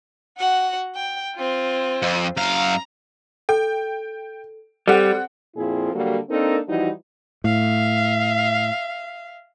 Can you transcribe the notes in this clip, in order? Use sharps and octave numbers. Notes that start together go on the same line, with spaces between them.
F#4 F#5
G5
C4 F4
F2
F#2 F5 A#5
A4 G5
G3 C4 A4 F#5
F2 A#2 F3 C4 E4 G#4
D3 F#3 G3 A#3 F#4 A4
A#3 C4 D4 D#4 A4 A#4
E3 F3 G3 D#4 E4 F#4
A2 E5 F5